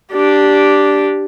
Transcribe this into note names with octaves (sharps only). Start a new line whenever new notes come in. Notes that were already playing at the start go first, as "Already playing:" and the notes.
D4 G4